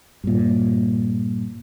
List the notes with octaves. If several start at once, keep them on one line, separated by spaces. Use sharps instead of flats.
G2 A#2